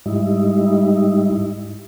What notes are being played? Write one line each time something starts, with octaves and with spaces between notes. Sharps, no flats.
G#2 G3 D#4 E4